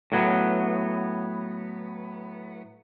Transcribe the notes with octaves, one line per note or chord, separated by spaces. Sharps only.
A2 F#3 B3